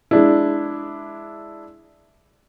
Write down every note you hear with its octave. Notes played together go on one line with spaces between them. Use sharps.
G#3 D4 E4